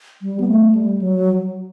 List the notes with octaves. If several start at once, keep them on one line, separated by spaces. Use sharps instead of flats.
G3
B3
A3
G3
F#3